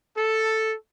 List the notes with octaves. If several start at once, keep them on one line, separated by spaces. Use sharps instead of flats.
A4